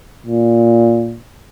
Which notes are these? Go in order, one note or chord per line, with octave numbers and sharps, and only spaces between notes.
A#2